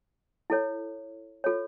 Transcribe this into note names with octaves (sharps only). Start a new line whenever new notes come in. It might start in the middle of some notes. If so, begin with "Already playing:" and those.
E4 A4 C#5
F4 A4 C#5